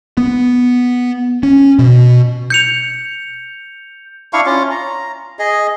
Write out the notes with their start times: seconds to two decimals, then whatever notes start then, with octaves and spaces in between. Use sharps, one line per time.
0.17 B3
1.43 C#4
1.79 B2
2.50 G6 C#7 F7
4.33 D4 E4 F5 C#6
4.46 C#4 F4
4.71 A#5
5.39 G#4 D#5